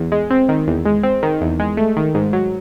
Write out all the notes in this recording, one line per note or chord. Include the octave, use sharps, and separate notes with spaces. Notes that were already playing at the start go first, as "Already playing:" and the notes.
Already playing: E2
G#3
C4
D#3
E2
G#3
C4
D#3
E2
G#3
A3
D#3
G#2
F#3